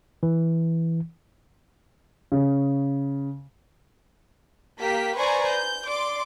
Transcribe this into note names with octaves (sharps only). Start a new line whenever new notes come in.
E3
C#3
A#3 G4 B6
B4 C5 D5 G#5 A#5 C#6
G6
D5 C6 D6